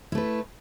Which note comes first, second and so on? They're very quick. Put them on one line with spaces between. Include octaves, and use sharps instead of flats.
E4 A3 B4